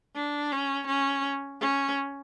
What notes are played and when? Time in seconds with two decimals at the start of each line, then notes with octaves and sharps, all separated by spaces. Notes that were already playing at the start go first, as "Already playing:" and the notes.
0.15 D4
0.52 C#4
0.87 C#4
1.60 C#4